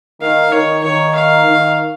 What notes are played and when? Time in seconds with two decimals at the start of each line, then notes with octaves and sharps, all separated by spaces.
0.21 D#3 F5
0.52 D#3 C#5
0.83 D#3 C#5
1.15 F5
1.47 D#3